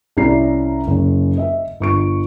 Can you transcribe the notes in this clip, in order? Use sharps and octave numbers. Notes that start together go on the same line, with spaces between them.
C2 C#4 E4 D5 A#5 C7
F#1 C#4
D#5 E5
G1 C#6 D7